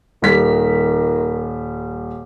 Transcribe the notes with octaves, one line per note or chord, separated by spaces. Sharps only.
D#1 D#3 G3 B6